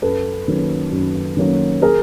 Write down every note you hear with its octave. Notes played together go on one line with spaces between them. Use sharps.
F#2 A4 B4
D#3 F#3 A#3 C#4
F#2
D#3 F#3 A#3 C#4
G#4 A#4